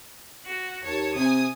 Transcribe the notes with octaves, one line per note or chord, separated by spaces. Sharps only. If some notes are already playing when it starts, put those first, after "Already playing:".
F#4
D#2 C#5 A5
C3 G#5 D#6